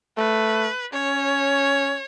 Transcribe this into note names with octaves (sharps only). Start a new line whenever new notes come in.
A3 B4
C#4 C#5